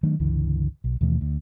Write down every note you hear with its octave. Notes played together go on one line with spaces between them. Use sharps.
D#3 F#3 A3 D4
G1 C#2 D3 E3
B1
D#2 B2 E3 A3
D2